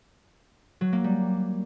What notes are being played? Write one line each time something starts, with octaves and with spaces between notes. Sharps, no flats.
F#3
A#3
G3